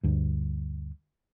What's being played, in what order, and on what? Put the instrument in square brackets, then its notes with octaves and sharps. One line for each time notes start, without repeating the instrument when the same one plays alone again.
[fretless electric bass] D2 G2